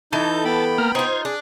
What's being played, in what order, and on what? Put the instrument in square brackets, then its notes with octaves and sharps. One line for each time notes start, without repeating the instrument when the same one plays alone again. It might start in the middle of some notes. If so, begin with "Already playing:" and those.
[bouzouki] E3 A4 [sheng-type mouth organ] D#4 G6 [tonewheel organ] A5
[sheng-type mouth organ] B3 G5 B5
[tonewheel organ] A#3 A#5 F6
[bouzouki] D#4 F4 [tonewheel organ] C5 G#6
[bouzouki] D4 [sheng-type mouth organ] G#4